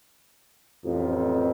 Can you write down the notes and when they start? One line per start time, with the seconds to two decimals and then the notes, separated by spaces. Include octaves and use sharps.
0.84 A1 F2